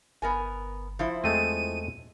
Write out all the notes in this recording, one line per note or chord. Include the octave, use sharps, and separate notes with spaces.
G1 B3 A#4 G#5
F3 E4 C5
E2 G#3 A3 C4 D#7